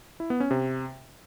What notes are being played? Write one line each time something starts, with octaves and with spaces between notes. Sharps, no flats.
E4
B3
C#4
C3